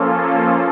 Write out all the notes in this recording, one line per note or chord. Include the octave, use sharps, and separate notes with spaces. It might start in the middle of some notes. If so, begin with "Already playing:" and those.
Already playing: F3 A#3 C#4 F4 A4